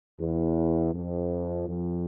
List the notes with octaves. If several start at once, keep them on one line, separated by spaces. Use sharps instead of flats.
E2
F2
F2